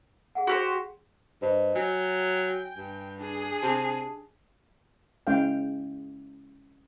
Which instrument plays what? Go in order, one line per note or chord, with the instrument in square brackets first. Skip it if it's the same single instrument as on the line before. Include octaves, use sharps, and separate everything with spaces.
[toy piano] G#4 F5 F#5
[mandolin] F#4 G4 C5
[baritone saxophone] G2 [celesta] C5 D#5
[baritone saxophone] F#3 [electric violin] G5 [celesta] G#5
[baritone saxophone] G2
[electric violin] D4 G#4
[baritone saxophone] C3 [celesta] A5
[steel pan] G#3 C#4 E4 F5 G5